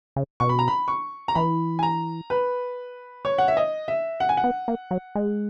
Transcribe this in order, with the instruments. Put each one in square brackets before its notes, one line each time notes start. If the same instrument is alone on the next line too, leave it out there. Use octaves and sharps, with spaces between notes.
[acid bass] C#3
[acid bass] B2 [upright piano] C#6
[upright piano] B5
A#5
B5
C#6
A#5
[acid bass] E3 [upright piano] B5
[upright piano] G#5
A#5
B4
C#5
F#5
E5
D#5
E5
F#5
G#5
F#5
[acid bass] B3
A#3
F#3
G#3